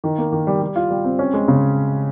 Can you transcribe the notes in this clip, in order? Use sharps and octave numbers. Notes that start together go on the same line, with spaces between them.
D#3
A#3
D#3
G3
G3
F4
G3
C4
C#4
G#3
C#3